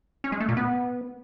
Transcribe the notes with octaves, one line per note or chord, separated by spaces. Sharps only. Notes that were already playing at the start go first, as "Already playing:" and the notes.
C#4
G#3
A3
A#2
B3